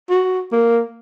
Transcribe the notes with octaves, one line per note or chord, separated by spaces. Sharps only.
F#4
A#3